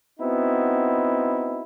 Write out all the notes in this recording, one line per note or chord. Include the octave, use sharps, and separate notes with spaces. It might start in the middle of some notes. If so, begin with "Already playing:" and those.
B3 C4 D#4 E4 F#4